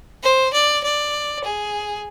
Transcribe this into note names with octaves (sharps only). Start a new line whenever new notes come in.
C5
D5
D5
G#4